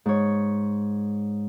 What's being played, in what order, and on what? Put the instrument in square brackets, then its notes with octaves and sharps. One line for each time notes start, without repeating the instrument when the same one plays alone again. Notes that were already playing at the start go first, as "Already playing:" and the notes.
[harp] G#2 C#5